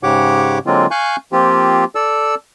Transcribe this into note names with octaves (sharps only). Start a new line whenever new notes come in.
G#2 C#3 G4 C#5 F#5 D6
D3 F#3 G#3 A#3 C4 F4
F5 G#5 C#6 F#6 G6
F3 A#3 C4 F4 G4
A4 D5 E6